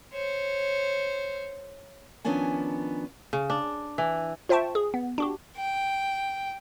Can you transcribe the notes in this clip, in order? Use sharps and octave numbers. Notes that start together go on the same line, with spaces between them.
C5 C#5
D#3 F3 B3 C#4 D4 G#5
C#3
D4
E3
F4 C5 E5 G5 A5 C#6
G#4
B3
D4 F#4 G4
G5